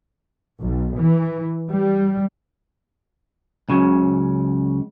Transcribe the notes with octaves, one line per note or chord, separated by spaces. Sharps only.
B1
E3
G3
C#2 C#3 F#3